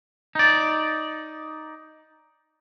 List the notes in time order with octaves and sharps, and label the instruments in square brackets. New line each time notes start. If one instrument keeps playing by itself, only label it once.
[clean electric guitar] D#4 D5